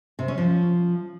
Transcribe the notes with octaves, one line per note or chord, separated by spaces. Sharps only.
C3
C#4
F3